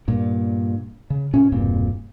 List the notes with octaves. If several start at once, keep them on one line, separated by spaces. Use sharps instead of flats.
G2 A#2
C#3
A#2 C#4
E1 G2 A#2 C4